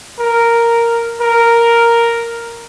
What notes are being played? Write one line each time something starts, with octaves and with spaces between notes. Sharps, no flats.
A#4
A#4